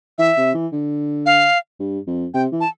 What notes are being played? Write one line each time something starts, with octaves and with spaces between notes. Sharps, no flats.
E3 E5
C3
E3
D3
F5
G2
F2
C3 G5
E3
A5